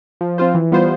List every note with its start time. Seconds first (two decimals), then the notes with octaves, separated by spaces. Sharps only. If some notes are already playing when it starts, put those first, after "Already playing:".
0.21 F3
0.38 C4 F4 C5
0.54 E3
0.72 G3 B3 F4 C5